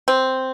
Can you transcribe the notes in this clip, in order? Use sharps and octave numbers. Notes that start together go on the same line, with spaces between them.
C4